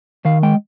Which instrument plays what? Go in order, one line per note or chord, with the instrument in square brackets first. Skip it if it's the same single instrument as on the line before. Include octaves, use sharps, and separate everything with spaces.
[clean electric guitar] D#3 F5
G#3 G5